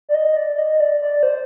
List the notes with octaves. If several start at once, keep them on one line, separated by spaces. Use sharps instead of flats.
D5
D#5
D5
D#5
D5
D5
C5